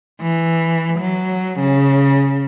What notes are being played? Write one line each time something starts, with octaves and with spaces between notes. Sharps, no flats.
E3
F#3
C#3